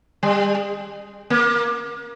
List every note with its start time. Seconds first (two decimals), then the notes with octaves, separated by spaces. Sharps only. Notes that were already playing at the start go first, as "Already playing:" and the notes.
0.23 G3
1.30 A#3